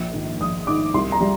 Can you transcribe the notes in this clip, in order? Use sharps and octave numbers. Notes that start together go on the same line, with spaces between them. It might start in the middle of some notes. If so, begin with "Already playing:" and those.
Already playing: A#1
G#2 D#3
A#1 D#6
G#2 D#3 D6
C2 C6
A#5
G3